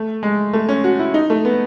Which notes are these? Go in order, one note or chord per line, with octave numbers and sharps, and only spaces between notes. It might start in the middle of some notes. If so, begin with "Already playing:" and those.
Already playing: A3
G#3
A3
C#4
F#4
E4
D#4
A3
B3